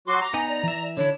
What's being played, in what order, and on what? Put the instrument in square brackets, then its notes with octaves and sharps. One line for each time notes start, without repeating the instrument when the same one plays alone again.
[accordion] F#3 F#4 C6 [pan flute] D6
[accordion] A#5
[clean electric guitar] B3 D#4 D#5 [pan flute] G#5
[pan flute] D5
[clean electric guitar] E3 E5
[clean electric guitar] D3 D4 E4 [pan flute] C#5